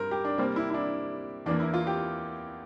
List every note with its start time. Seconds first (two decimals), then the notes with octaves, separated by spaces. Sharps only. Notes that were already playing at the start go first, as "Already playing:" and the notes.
Already playing: G2 A#4 C5
0.11 G4
0.24 D4
0.38 C3 G3 A#3 C4
0.56 E4
0.70 E4
0.74 D4
1.46 E2 E3 A#3 D4
1.60 E4
1.74 F4
1.87 G4